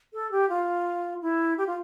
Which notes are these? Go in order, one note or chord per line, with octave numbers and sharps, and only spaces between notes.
A4
G4
F4
E4
G4
F4